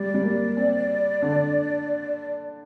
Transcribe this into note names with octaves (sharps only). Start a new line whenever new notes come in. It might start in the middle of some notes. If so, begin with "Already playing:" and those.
Already playing: G3 D5
G3
A#3
C4
D3